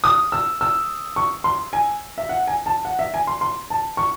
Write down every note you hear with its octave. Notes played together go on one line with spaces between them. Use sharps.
D#6
E6
E6
C#6
C6
G#5
E5
F#5
G#5
A5
F#5
E5
G#5
C6
C6
A5
C#6